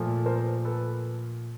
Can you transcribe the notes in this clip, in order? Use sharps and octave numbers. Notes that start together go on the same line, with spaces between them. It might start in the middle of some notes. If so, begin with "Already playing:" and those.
Already playing: A#2 F3 A3
A#4 C5
A4 B4